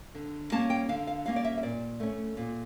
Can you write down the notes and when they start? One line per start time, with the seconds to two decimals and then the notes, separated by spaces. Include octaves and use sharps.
0.15 D3
0.52 G3 A#3 C#4 A5
0.70 G5
0.89 D3 F5
1.07 F5
1.26 G3 A#3 C#4 F5
1.36 D5
1.45 E5
1.58 E5
1.63 A#2 D5
2.00 A3 C#4
2.37 A#2